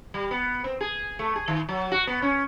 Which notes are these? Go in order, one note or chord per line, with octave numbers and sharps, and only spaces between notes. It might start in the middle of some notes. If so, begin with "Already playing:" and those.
G3
B3
C4
G#4
A3
G#4
D#3
F#3
F#4
B3
C#4